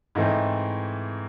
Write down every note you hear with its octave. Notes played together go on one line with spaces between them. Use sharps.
G#2 E3 A3 C4 D#5